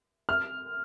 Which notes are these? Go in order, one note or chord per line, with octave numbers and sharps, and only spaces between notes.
F6